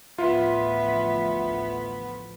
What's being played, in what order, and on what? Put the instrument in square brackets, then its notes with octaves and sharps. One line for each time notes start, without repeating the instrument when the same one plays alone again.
[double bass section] A1 D2 F3 [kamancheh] B3 [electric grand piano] F4 [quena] E5